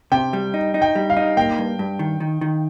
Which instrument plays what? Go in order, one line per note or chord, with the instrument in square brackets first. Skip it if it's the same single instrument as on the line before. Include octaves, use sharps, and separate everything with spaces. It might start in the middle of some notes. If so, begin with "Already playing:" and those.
[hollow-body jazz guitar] C3 [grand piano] G5
[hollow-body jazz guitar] G3
D#4
D#4
[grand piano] G5
[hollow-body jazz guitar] G3
[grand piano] F5
[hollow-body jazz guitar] D#4
[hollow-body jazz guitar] A#3 [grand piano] G5
[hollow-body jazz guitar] G2
G2
D#3
D#3
D#3